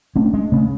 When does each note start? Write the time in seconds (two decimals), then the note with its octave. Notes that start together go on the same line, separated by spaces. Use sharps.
0.16 A3 C#4 D4
0.34 G#3
0.52 C#3 A3 C#4